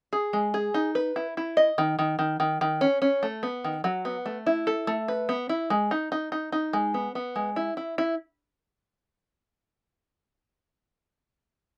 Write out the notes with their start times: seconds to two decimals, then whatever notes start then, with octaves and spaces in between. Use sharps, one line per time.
0.13 G#4
0.33 G#3
0.54 G#4
0.74 D#4
0.95 B4
1.16 E4
1.37 E4
1.57 D#5
1.78 D#3
1.99 D#3
2.19 D#3
2.40 D#3
2.61 D#3
2.81 C#4
3.02 C#4
3.23 A3
3.43 B3
3.64 D#3
3.84 F#3
4.05 B3
4.26 A3
4.46 E4
4.67 A4
4.87 A3
5.08 B4
5.29 B3
5.49 E4
5.70 G#3
5.91 D#4
6.12 D#4
6.32 D#4
6.52 D#4
6.73 G#3
6.94 B3
7.15 B3
7.36 G#3
7.56 E4
7.77 E4
7.98 E4